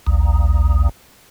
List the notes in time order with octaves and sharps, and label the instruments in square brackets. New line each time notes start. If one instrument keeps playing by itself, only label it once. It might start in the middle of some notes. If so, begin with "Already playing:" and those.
[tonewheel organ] A#1 D#2